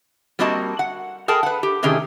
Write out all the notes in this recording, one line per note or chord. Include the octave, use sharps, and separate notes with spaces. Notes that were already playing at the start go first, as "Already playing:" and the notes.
G3 A#3 C4 F#4 D#5 A5
F#5
G#4 A#4 G5 A5
B4 F#5
G4
A2 C3 D#3 C#4 G4 G#4